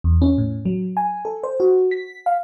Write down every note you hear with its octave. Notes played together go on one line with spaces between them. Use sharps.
E2
C#4
A2
F#3
G#5
A4
C5
F#4
B6
F5